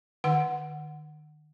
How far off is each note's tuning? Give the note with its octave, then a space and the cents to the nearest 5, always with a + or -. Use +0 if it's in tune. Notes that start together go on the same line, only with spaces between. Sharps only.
D#3 -40 F#5 +0